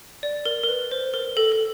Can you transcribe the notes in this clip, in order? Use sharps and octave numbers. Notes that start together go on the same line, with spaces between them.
D5
A#4
A#4
B4
C5
A#4
A4
A4